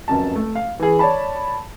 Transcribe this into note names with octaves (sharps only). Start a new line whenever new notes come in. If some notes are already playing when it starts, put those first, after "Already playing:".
F1 F#2 A5
A3
F5
E3 G#4
C#5 D5 A5 B5